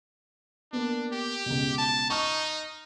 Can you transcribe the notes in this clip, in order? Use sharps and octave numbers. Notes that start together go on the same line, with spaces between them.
A#3 B3 D4
G4
C#2 B2
A5
D#4 C#6 F6